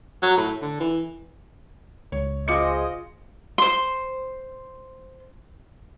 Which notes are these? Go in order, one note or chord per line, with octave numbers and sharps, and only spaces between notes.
F#3
A2
D3
E3
C#2 C#5
F4 G#4 C5 D#5 D6 C#7
C5 C6